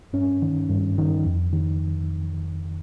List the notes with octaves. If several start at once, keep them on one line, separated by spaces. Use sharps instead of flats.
G2 C#4
D#3
G2
D#3
F2
D#3